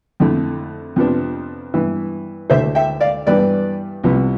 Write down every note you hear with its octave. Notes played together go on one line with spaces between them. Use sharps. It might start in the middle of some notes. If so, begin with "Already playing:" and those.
F2 D3 A3 E4
F2 C3 F3 B3 D4
G2 E3 B3 E4
D2 D3 A3 E4 C5 E5
E5 G5
D5 F5
G2 E3 G3 B3 B4 D5
C2 C3 F3 B3 E4